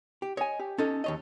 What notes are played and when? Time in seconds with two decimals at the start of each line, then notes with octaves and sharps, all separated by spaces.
0.22 G4
0.37 C#5 D#5 G#5
0.59 G4
0.78 C#4 D#4 A4
1.04 D#2 C#5 D#5